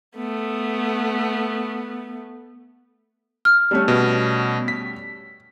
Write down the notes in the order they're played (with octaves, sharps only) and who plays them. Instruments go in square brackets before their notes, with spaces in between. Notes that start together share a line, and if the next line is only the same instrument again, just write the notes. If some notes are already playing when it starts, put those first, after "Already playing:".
[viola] A3 B3
[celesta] F6
[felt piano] G3 A3 C#4
[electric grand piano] B2
B6